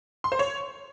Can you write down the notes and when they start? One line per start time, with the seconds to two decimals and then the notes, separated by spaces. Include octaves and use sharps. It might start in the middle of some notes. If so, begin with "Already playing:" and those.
0.24 C6
0.32 C5
0.39 C#5